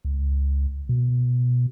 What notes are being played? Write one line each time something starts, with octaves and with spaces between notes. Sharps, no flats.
C#2
B2